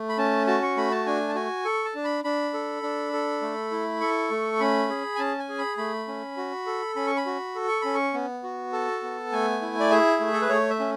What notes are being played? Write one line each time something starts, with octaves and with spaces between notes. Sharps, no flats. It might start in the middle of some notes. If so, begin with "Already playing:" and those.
Already playing: A3
B5
C#4 A5
F#4 A5
C#6
A3 B5
A5
D4 G#5
A5
F#4 G#5
A4 C#6
A5
D4
B5
D4 B5
A4
D4
A4
A3
E4
A4 C#6
A3
C#4 B5
G#4
G#5
C#4 A5
G#5
G#4
B5
A3 B5
C#4
F#4
A4
C#4 B5
C#6
B5
F#4
A4
C#6
C#4 B5
C#6
B3
F#4
A4 A5
B3
A3 G#5
E4
D5
G#4 E5
A3
A4
B4
A3 C#5
E5
C#4